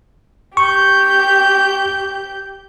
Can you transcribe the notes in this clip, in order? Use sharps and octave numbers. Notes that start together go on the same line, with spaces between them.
G4 C#6 G6